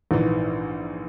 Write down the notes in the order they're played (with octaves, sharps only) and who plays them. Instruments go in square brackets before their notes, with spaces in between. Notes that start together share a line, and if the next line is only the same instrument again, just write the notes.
[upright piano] A#1 G#2 E3